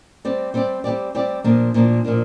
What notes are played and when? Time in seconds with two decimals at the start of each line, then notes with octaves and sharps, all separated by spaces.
0.25 G3 C4 G4 D5
0.54 G3 C4 G4 D5
0.84 G3 C4 G4 D5
1.15 G3 C4 G4 D5
1.44 A#2 F3 A#3 D4
1.74 A#2 F3 A#3 D4
2.04 A#2 F3 A#3 D4